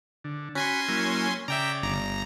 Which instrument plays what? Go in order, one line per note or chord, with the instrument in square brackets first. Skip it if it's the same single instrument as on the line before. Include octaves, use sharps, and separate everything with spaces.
[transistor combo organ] D3
[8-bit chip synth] C#4 G#5 C6 [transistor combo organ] F#4 B5
[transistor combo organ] F#3 A#3 E4
[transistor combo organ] C#3 D5 [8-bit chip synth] E5 G5 A#5
[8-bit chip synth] G1 A#5